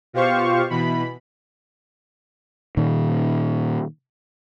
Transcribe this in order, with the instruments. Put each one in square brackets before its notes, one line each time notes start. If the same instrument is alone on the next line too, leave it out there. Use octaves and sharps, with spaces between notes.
[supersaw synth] B2 F4 G4 C5 F5 C#6
B2 E3 B5
[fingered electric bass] A#2 D#3